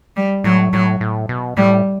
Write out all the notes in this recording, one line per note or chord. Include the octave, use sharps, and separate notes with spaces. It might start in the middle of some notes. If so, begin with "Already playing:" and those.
G3
A2 F#3
A2 F#3
A2
B2
A2 G3